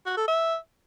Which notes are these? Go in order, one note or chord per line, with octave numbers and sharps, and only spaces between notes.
F#4
A4
E5